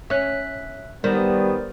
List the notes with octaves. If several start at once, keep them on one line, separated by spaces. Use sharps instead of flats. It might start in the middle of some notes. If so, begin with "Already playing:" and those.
C#4 E5 F#6 B6
D#3 G3 B3 A#4 C5 D5